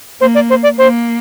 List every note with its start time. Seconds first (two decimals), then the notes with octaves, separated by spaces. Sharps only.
0.21 A#3 C5
0.35 D5
0.50 C5
0.63 D5
0.77 A#3 C5